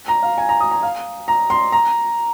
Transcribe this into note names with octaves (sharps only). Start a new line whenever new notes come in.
A#5
F5
G#5
A#5
D#6
A#5
F5
A#5
C6
A#5